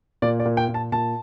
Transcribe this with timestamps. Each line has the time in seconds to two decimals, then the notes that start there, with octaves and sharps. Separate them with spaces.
0.22 A#2 D5
0.40 D5
0.45 A#2
0.57 G5
0.68 A#2
0.74 A5
0.92 A#2 A5